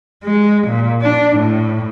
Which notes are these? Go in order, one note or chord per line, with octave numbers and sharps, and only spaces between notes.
G#3
A#2
D4
A2